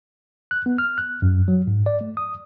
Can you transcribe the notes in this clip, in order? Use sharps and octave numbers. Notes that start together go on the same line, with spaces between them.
F#6
B3
F6
F#6
F#2
F#3
G#2
D5
A3
D#6